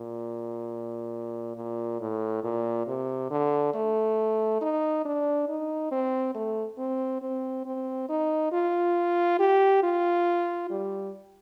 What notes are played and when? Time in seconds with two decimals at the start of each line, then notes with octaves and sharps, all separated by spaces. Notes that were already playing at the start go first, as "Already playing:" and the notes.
Already playing: A#2
1.56 A#2
2.00 A2
2.44 A#2
2.87 C3
3.31 D3
3.74 A3
4.61 D#4
5.05 D4
5.49 D#4
5.91 C4
6.35 A3
6.78 C4
7.22 C4
7.66 C4
8.09 D#4
8.52 F4
9.39 G4
9.83 F4
10.70 G3